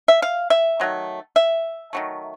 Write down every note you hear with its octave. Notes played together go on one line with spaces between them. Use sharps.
E5
F5
E5
D#3 F#3 A3
E5
D#3 F#3 A3